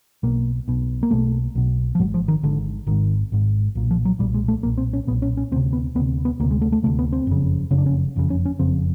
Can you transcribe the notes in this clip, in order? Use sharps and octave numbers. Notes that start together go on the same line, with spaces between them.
B1 B2 A#3
B1 B2
A#3
B1 B2 A3
B1 B2
F3
G#1 G#2 F#3
F3
D#3
G#1 G#2 D3
G#1 G#2 D#3
G#1 G#2
B1 A#2
F3
F#3
B1 A#2 G3
G#3
A3
B1 A#2 A#3
C4
C#4
B1 A#2 B3
C#4
C#4
D2 C3 C4
B3
D2 C3 B3
B3
D2 C3 A#3
G#3
A3
A3
D2 C3 A3
B3
C4
F#1 F2 C#3
F#1 F2 C#3 C#4
D4
C#4
F#1 F2 C#3
C#4
C#4
F#1 F2 C#3 C4